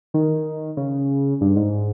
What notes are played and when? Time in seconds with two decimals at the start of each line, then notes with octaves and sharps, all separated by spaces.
0.14 D#3
0.77 C#3
1.41 G2
1.56 G#2